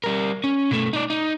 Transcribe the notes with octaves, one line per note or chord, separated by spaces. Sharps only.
G3 A#4
C#4
B2 A3
D#4 D5
D#4